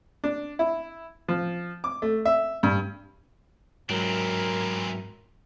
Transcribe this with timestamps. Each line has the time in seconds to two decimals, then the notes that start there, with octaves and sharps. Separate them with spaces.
0.24 D4
0.59 E4
1.28 F3
1.84 D6
2.02 A3
2.25 E5
2.63 G2
3.89 G#2 E3 F#3 C4 A#4